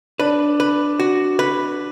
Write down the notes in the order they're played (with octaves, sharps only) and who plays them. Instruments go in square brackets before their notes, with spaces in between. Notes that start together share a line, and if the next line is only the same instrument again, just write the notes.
[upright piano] D4 [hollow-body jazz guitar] B4
[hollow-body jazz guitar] B4
F#4
B4